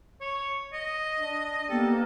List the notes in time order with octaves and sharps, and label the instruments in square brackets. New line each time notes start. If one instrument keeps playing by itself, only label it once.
[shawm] C#5
D#5
[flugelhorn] D4
[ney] A#3 [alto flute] B3 [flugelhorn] G4 [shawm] A4